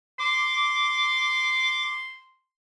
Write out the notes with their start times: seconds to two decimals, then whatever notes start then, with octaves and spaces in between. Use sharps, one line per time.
0.19 C6 D6